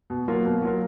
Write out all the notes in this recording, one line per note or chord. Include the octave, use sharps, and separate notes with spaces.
B2
F#3 A#3 F4 A#4
B2
F#3 A#3 F4 A#4